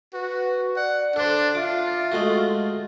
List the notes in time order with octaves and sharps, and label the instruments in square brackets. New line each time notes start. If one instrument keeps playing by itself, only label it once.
[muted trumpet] F#4 [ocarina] B4
[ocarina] D5 [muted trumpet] F#5
[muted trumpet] D4 [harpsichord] A4 C5
[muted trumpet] F4 [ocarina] E5 [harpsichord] D6
[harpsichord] G#3 A3 F#4